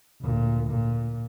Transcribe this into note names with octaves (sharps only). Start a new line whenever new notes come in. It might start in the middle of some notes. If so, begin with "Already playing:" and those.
D2 A#2
A#2